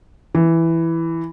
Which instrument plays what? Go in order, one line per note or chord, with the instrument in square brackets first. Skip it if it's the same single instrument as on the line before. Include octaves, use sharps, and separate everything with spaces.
[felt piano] E3